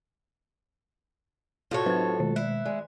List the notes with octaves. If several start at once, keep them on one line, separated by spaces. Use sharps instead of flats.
A2 C3 F4 F#4 A4 C#5
F#3 D#4 B4 C5 G#6
B2 D#3 G#3
E4 F#6
G#3 D5